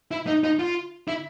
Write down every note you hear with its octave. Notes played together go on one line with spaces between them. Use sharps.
E4
D#4
D#4
F4
E4